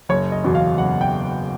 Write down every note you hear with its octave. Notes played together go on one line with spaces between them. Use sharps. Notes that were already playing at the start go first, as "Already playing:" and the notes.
F#1 C#5
D#5
E2 B2
F5
F#1 F#5
G5